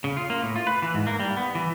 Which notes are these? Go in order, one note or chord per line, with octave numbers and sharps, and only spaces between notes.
C#3
F4
A#3
A2
F4
B4
E3
G#2
A#3
G3
B3
E3